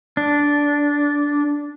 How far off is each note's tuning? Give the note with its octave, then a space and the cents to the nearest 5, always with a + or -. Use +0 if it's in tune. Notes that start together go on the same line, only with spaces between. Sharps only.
D4 -10